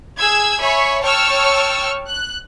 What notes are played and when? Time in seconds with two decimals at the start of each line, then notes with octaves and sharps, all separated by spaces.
0.18 G#4 E6 G#6
0.61 C#5 E5 G#5 B5 C#6
1.03 C#5 G5 A5 C#6 E6 F6
2.08 F#6